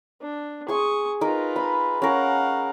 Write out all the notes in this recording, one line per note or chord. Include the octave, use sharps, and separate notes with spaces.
D4
G#4 C6 C#6 D#6
D#4 F4 A#4 B4
B5
C#4 A#4 F5 F#5